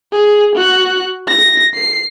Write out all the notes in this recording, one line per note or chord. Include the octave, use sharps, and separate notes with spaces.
G#4
F#4 F#6
A#6
C7